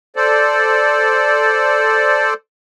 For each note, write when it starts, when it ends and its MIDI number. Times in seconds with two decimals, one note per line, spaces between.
0.16 2.34 69
0.16 2.34 72
0.16 2.34 74